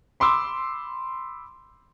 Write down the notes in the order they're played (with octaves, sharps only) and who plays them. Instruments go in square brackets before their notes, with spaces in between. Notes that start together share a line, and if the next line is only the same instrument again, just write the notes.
[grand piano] B5 C6 D6 E6